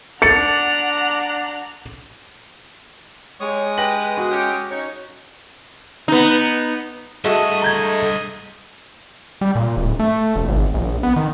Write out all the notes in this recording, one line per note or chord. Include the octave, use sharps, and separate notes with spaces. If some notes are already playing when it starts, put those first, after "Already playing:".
D4 F#5 A#5 A6 C#7
G#3 G4 C#5 D#6
G4 B4 G5 A#6 F#7
B2 A#3 F#4 G#4
C#4 G4
C#4 D#4 C#5
B3 D#4
G2 G#3 A3 F#4 D#5
A#5 G6 G#6
G3
A#2
D1
A3
E1
G#1
A#1
B3
D#3